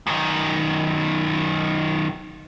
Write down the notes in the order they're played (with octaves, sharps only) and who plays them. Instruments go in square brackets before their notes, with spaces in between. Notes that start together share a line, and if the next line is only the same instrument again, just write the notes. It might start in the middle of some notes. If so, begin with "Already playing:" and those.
[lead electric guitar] F#2 D#3